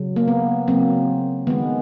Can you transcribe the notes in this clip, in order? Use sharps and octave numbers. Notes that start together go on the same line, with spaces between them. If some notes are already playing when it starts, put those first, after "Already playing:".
Already playing: C#3 F#3
A#3
B3
C#3 F#3 A#3 C4
D#3 G#3 B3